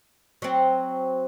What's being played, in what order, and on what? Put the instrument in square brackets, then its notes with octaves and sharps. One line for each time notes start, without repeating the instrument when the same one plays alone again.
[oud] F#3 C4